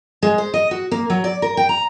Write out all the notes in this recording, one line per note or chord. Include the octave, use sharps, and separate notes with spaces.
G#3
C5
D#5
F#4
A#3
F#3
D5
A#4
G5
A#5